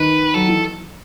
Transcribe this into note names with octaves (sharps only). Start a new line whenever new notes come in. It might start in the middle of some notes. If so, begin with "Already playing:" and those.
Already playing: D#3 B4
F#3 A4
E3